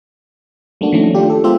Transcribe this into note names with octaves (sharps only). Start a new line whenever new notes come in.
G3 A3 A#3 D4 F#4
D#3 F3 A3 C#4 D4
D4 F4 G4
A4
G#3 B3 F4 G4 C5 E5